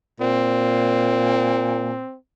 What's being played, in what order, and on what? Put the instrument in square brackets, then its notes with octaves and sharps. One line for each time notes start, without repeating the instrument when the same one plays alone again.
[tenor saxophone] A#2 [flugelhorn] C4